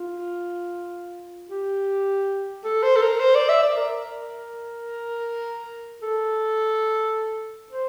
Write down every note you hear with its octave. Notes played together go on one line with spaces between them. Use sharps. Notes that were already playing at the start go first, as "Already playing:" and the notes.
Already playing: F4
G4
A4
C5
A4
A#4
C5
D5
E5
D5
A#4
A4
C5